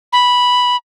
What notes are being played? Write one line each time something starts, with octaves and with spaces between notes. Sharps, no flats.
B5